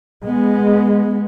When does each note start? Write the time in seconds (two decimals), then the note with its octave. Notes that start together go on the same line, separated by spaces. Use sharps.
0.24 G#3 B3